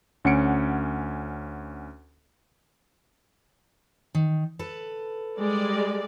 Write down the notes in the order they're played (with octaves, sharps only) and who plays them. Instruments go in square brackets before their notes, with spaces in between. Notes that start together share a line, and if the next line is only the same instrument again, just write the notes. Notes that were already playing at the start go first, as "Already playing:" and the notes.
[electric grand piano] D2 C#4 F#5 C#7 D7
[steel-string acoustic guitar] D#3
A4 B4
[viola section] G3 G#3 D5